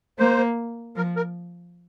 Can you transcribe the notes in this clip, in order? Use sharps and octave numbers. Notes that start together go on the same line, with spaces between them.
A#3 C5
F3 A#4
A#4